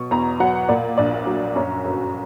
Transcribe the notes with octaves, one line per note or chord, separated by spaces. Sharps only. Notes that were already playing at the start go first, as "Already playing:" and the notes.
Already playing: B2 F#3 C#6
E2 A#5
F#3 F#5
A#2 D5
A#1 D5
F#3
F#2 C#5
G1